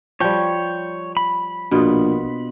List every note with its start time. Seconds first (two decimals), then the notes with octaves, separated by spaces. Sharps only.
0.20 F3 G3 C#5 G5
1.17 B5
1.71 A#1 B2 B3 F4